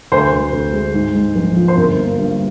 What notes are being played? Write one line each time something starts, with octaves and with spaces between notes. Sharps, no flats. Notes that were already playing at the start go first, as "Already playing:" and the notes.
D2 C5
D2
D2
G#3
G#2
G#2
A#1
F3
C5
G1 A#4
A#3
G2